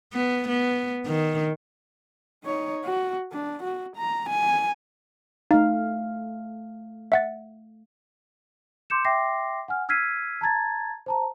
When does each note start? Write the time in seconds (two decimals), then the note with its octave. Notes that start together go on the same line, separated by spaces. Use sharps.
0.13 B3
0.48 B3
1.05 D#3
2.44 D#4 C#5
2.84 F#4
3.33 D4
3.64 F#4
3.97 A#5
4.30 G#5
5.51 A3 D#4 F5
7.12 E5 F#5 A6
8.90 C6 D6 G6 C#7 E7
9.05 E5 G5 C6 D6 A#6 C7
9.68 F#5 G#5 F6
9.89 E6 F6 G#6 B6 C7 D#7
10.41 A5 A#5 G#6 A6
11.06 C5 A5 A#5